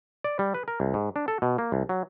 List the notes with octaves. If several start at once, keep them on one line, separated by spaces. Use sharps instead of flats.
D5
G3
B4
A#4
C2
G#2
D4
A4
B2
A#3
C2
F#3